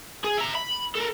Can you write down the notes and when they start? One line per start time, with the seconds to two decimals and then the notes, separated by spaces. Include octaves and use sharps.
0.24 G#4
0.37 E5 A#5
0.55 B5
0.96 A4 A#4